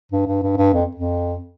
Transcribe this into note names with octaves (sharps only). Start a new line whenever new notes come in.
G2
G2
G2
G2
F2
F2